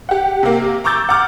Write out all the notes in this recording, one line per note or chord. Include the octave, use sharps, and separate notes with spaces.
G4 F#5
C3 A#3
A#5 C#6 D6 E6 G6 A6
F#5 A#5 D6 F6